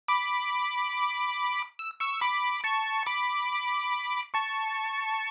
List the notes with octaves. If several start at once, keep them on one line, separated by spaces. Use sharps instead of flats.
B5 D6
E6
C#6 E6
B5 D6
A5 C#6
B5 D6
A5 C#6